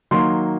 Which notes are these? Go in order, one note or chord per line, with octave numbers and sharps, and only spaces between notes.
D#3 F#3 A#3 C6